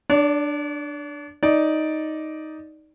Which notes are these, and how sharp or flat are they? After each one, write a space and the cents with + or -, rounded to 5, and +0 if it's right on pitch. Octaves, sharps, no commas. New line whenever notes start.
D4 +10 D5 -40
D#4 +5 D5 +0